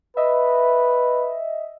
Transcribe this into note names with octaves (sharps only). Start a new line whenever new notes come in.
B4 D#5 E5